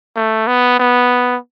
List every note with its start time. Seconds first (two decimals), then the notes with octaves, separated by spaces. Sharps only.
0.16 A3
0.47 B3
0.79 B3